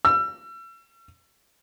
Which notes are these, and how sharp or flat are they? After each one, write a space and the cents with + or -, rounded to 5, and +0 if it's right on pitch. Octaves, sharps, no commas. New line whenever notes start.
E6 +40